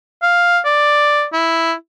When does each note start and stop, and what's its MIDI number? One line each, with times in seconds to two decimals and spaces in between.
0.22 0.59 77
0.65 1.25 74
1.33 1.73 64